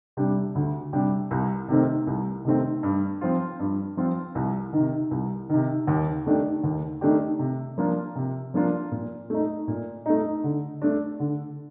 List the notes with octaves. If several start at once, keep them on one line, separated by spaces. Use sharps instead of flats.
C3 G3 D4 G4
D2
C3 G3 D4 G4
C2
C3 D#3 A3 C4
C2
C3 D#3 A3 C4
G2
F3 C4 F4
G2
F3 C4 F4
C2
C3 D#3
C2
C3 D#3
D#2
D#3 A3 D4 G4
D#2
D#3 A3 D4 G4
C3
F3 A#3 D4 F4
C3
F3 A#3 D4 F4
A#2
A3 D#4
A#2
A3 D#4
D3
A3 D4
D3